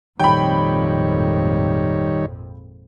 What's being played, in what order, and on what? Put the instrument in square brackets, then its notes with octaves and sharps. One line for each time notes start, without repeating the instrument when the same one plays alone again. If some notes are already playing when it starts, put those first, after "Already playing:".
[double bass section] G#1 F2 A#2 [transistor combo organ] D#3 G3 C#5 [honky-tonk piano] G5 B5